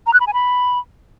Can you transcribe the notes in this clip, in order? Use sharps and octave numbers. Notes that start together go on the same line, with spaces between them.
A#5
F#6
B5
G#5
B5